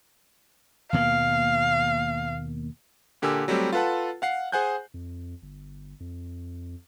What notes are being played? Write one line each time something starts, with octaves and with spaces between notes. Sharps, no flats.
D#2 B2 A#3 F5
A#2 D3 G4 A#4 G#5 E6
F#3 G3 A3 C4 G4
F4 A4 B4 F#5 A5
F5 F#5 C7
G#4 C5 F#5 G#5 F#6 G6
F2
G1
F2